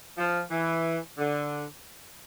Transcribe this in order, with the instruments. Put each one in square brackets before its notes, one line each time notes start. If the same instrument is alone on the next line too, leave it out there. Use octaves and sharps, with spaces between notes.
[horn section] F3
E3
D3